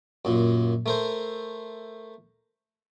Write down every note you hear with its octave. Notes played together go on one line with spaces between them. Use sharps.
F#2 A#2
A3 A#4 C5